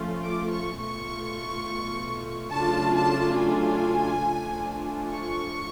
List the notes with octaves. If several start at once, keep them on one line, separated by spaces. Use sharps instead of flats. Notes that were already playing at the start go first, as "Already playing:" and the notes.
Already playing: F3 A3 C#4 F4
D6
C#6
B2 A3 F4 C#6
C#3 F#3 A3 D4 F4 A5
A5
G#5
F3 A3 D4 F4
C#6